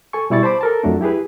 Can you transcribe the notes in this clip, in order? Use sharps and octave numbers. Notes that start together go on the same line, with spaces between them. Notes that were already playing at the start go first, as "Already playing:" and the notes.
A4 G#5 C#6
B2 G3 E4 D5 C#6 A6
C5 A5 B5 D6
A4 A#4 A5
F2 F#3 A3 D4
E4 G4 G#4 B4